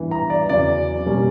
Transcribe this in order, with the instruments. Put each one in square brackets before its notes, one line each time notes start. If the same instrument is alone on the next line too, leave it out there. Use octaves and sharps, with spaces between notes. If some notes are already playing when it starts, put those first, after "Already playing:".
Already playing: [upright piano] G2 E3 B3
A#5
D5
E2 C#3 F#3 D5
B2 G3 A#3 C#4